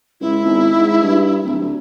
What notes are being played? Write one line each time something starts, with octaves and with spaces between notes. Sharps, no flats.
C#2 E4
G#1
G#2
G2
D1
D2